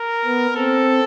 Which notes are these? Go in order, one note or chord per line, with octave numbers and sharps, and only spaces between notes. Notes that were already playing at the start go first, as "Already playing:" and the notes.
Already playing: A#4
B3
C4 A4